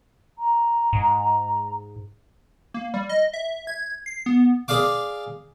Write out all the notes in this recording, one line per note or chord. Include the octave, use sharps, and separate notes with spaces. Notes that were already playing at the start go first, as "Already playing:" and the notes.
A#5
G#2
A#3
G3
D#5
E5
G#6
C7
B3
G#4 D5 F5 D6